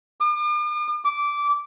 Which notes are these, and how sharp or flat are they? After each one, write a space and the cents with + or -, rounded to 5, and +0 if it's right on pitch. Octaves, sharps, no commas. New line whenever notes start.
D6 +45
D6 -15